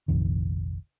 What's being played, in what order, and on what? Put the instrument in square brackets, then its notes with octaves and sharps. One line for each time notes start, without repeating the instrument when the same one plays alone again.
[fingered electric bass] F1 A#1 F2 D#3